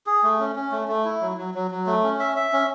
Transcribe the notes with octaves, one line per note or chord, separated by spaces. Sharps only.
G#4
A3
C#4
C#4
A3
A3
E4
F#3
F#3
F#3
F#3
A3
C#4
E5
E5
C#4